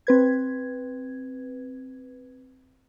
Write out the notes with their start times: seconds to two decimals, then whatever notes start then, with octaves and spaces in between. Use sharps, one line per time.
0.07 C4 B4 G#6